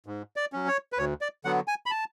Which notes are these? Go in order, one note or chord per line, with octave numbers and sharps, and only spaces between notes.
G#2
D5
F#3 C#4
C#5
B4
D2 C#5
D5
D3 F#3 B3 F#5
G#5
B5
A5